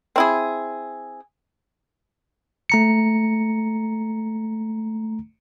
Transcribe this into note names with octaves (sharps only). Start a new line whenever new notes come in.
C4 E4 G#4
A3 A#5 C#7